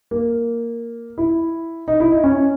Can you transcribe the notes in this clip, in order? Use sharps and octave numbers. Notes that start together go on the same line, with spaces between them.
A#3
E4
D#4
E4
D#4
C#4